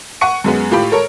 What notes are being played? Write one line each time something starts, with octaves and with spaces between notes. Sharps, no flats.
F#5 C#6 C#7 D#7
F#2 G#3 B3
A2 F4 G4 B5
A4 A#4 C#5